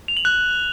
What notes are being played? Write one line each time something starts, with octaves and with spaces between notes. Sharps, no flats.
F7
F#7
F#6